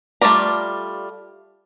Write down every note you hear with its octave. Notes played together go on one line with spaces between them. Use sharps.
G3 A3 F4 D5 A#5